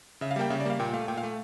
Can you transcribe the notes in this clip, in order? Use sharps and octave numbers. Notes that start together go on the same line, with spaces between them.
C#3 E5
F5
G3 A#3 G5
C#3 E5
D5
G3 A#3 F5
A#2 G5
A3 F5
A#2 G5
F5
A3